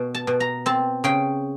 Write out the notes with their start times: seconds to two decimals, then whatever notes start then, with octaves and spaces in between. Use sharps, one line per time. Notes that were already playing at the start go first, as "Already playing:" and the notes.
Already playing: B2
0.15 A5
0.27 B2
0.40 A#5
0.66 C4 A5
1.04 C#3 G5